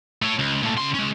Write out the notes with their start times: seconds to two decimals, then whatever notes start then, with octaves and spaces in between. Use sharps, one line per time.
0.22 A3 C#5
0.39 C#2
0.63 A#2 A3
0.78 C#3 C6
0.94 G#3 C#4